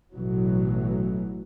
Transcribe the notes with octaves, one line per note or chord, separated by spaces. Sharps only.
A1 B2 E3 F#3